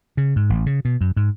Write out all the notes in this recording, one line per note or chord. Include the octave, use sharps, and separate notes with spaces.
C#3
G#2
A1
C#3
B2
F#2
G#2